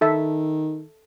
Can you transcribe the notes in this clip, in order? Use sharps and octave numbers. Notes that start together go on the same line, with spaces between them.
D#3 A4 E5